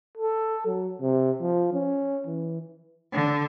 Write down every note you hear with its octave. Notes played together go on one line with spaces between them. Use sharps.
A4
F#3
C3
F3
C#4
E3
D3